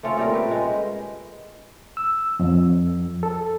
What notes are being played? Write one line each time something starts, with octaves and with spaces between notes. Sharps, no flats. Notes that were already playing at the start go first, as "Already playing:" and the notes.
A3 C4 C#4 F4
A#2 G3 A3 A#4
B4 G5
G#3
E6
F2
A4